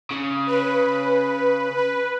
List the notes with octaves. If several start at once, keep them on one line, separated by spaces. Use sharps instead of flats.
C#3
B4
B4